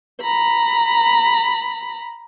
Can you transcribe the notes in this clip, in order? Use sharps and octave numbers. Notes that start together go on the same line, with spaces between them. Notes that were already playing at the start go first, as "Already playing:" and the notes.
A#5 B5